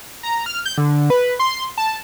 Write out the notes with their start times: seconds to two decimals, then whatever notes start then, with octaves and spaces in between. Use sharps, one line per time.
0.23 A#5
0.46 F6
0.66 G6
0.78 D3
1.10 B4
1.39 C6
1.78 A5